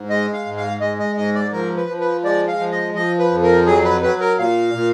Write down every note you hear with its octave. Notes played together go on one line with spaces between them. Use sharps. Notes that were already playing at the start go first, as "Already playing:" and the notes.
Already playing: G#2
G#3 D#5
F5
G#2
F5
G#3 D#5
D#5
G#2 D#5
D5
F3 A#4
B4
F3
B4
G#3 D5
F5
F3
D#5
F3 D#5
B4
F2
A#4
F#3 G#4
B4
F#3 B4
A#4
A#2 F5
A#2